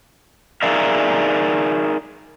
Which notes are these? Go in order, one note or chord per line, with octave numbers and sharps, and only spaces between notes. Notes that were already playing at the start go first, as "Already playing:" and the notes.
D#4 G#4 A#4 D5 E5 F5